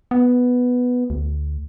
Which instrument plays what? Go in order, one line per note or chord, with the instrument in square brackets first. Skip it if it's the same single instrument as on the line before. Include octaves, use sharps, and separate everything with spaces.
[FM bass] B3
D2